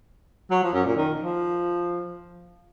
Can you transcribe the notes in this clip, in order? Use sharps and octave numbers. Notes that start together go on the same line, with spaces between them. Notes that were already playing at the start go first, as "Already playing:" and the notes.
F#3
F3
F#2
A#2
D#3
F3